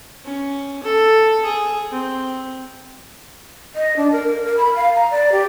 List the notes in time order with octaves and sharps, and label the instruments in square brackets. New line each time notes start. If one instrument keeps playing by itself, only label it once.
[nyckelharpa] C#4
A4
G#4
C4
[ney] D#5
D4
A#4
A#4
A#4
B5
F5
A#5
D5
G4